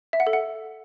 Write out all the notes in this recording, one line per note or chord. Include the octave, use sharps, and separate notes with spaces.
E5
F#5
A4
F#5